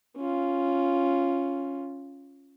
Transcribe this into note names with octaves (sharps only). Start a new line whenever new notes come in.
C#4 F4